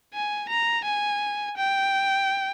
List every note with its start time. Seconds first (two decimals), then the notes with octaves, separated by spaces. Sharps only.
0.14 G#5
0.49 A#5
0.84 G#5
1.57 G5